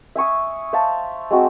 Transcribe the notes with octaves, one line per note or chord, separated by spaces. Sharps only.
E5 G#5 C#6 D#6
C5 E5 F5 A5
G#3 C4 F#4